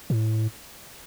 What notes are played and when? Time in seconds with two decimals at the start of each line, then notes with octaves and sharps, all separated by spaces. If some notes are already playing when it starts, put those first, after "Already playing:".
0.10 A2